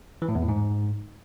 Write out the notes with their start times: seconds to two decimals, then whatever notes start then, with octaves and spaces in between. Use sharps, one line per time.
0.22 E3
0.29 A2
0.35 E2
0.42 A2
0.48 G#2